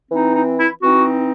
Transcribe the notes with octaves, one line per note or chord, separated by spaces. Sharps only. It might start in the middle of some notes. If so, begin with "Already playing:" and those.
E3 C4 D#4
D#4
E4
E3 C4 D#4 F#4